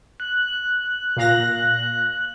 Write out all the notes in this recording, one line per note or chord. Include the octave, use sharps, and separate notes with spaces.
F#6
A#2 F5 A#6